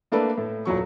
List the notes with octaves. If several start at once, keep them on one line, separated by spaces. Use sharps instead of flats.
A3 A#3 D4 A4 B4 D5
A2
D#1 A#2 F#3 C#6